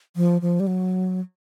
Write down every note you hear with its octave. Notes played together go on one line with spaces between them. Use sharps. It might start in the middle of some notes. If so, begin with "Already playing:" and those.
F3
F3
G3
F#3